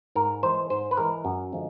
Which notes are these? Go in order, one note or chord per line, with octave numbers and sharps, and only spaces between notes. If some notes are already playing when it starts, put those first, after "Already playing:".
G#2 A#4
E3 G#3 C5
G#2 C5
B4
E3 G#3 A#4
F#2
D3 F3 G#3